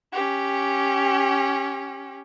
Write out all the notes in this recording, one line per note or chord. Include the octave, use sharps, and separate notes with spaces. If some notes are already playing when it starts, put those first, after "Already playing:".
C#4 G4